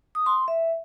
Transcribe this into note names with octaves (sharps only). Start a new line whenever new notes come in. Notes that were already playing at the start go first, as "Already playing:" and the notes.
D#6
C6
E5